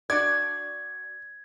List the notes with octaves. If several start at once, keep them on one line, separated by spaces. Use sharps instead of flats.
D4 F#4 D5 G#6